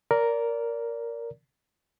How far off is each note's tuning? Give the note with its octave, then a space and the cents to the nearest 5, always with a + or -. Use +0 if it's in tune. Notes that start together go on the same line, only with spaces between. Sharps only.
A#4 +0 D5 -25